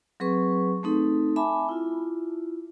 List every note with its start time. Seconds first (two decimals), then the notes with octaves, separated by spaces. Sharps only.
0.20 F#3 C4 G#4 B4 C#6
0.83 A3 C4 D#4 A4
1.36 E5 G#5 A5 B5 D6
1.69 E4 F4